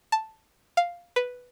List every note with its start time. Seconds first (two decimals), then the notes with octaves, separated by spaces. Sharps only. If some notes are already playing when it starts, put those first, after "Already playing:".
0.12 A5
0.77 F5
1.16 B4